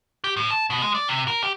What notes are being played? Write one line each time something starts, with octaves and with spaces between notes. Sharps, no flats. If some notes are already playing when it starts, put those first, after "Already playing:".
G4
A2
A5
B2
G#3
D5
C3
A#4
G4